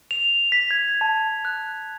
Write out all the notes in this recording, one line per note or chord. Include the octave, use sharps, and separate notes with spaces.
F7
B6
G#6
A5
F#6